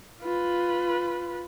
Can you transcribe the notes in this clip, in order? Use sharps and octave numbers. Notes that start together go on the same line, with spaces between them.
F4 B4